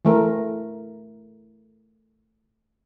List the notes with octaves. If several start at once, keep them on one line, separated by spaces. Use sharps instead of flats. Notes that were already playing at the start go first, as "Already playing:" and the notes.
E3 A3 A#4